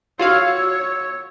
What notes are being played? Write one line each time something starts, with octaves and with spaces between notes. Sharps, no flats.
F4 F#4 C#5 F5 E6